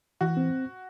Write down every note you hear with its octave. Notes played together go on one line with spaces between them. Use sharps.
E3 F#4
C4